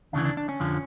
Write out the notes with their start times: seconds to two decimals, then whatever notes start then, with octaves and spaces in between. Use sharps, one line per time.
0.13 D2 C#3 E3 D4
0.25 D4
0.37 D4
0.49 C#4
0.60 F2 D3 F3